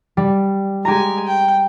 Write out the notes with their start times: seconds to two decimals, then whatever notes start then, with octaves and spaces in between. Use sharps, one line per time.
0.17 G3
0.85 G#3 G4 G#5 A#5
1.26 G5